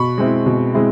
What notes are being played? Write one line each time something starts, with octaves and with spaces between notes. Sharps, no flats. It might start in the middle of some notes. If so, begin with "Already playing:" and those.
Already playing: B2 B5 C#6
G#3 C4 E4
B2
G#3 C4 E4